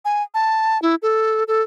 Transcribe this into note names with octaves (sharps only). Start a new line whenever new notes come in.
G#5
A5
E4
A4
A4